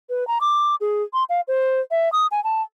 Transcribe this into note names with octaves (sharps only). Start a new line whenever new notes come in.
B4
A#5
D6
G#4
C6
F5
C5
E5
D#6
G#5
A5